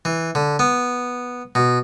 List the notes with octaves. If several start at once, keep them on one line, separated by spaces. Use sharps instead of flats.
E3
D3
B3
B2